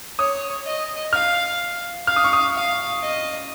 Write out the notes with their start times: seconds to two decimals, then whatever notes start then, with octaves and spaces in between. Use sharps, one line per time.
0.19 C#5 D#6
0.66 D#5
1.13 F5 F6
2.07 F5 F6
2.16 D#6
2.24 C#6
2.33 D#6
2.54 F5
3.02 D#5